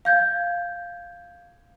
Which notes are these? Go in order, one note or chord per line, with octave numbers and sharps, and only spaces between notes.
F5 G6 G#6